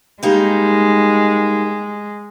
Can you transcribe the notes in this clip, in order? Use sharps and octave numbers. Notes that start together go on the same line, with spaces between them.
G3 G#3 A#3 D#4